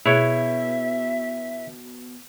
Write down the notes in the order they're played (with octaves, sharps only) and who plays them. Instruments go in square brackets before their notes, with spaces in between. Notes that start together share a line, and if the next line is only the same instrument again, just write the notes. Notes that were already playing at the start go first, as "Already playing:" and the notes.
[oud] B2 [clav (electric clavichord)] E4 C#5 [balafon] G#4 [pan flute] E5